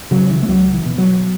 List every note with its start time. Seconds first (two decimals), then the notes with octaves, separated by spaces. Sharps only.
0.11 C#3 F#3
0.30 E3
0.42 A3
0.48 C#2 F#3
0.74 E3
0.85 B2
0.98 F#3